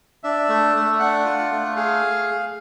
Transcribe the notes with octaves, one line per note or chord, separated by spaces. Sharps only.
D4 E5
A3
A3
D4 F#5
F4
A3
G#4 F5